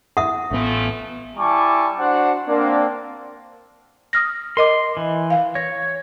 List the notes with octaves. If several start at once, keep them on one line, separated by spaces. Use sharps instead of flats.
E5 F#5 D#6
A1 E3 F3 A3 B3
G3 E4 G#5 A5 C#6 D6
D4 F#4 C5 F#5
A#3 C4 D4
D#6 F6 A#6
A#4 D#5 C6 D6
E3
F5
C#5 A#6